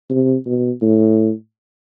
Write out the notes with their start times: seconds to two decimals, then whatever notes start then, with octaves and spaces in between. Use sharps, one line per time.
0.10 C3
0.46 B2
0.81 A2